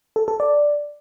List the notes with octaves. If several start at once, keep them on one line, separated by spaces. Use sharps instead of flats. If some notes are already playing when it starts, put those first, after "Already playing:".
A4
A4
D5